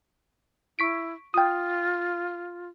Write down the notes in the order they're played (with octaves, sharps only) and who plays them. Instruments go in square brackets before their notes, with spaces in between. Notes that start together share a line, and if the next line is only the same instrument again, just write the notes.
[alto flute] E4 [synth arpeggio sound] C#6 B6 D7
[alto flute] F4 [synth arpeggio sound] G5 D#6